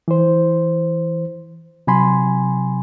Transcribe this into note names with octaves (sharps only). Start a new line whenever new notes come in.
E3 C5
C3 F#3 G#5 B5 C6